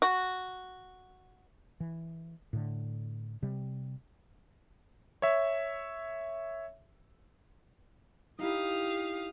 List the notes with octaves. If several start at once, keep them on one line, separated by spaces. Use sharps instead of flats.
F#4
E3
A2 D3
C3 G3
C#5 E5
D#4 E4 G4 F5 D#6